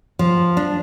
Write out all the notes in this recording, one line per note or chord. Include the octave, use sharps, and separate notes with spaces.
F3
D4